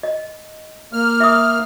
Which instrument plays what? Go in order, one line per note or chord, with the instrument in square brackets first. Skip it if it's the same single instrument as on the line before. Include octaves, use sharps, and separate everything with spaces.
[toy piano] D#5
[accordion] A#3 F6
[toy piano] E5 D#6